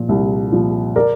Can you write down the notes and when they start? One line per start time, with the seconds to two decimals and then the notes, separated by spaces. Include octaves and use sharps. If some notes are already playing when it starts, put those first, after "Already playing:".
Already playing: A#2 F3
0.09 C2
0.52 A#2 F3
0.96 A#4 D5